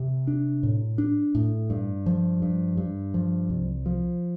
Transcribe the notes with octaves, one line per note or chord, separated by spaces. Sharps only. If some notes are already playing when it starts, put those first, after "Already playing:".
Already playing: C3
D4
A2
D4
A2
G2
F3
G2
G2
F3
C2
F3